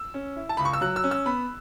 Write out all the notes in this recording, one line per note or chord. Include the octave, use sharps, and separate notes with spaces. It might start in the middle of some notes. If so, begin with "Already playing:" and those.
Already playing: E6
C#4
E4
A5
C#2 B5
C#6
E6
F#3 F#6
E6
C#4
E6
B3 B5